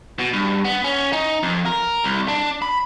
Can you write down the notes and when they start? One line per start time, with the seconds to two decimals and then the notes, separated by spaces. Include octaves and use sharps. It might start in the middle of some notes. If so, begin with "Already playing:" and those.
0.19 B2
0.33 G2
0.64 B3
0.84 C#4
1.13 D#4
1.43 F2
1.66 A#4
2.04 C2
2.28 D4
2.62 B5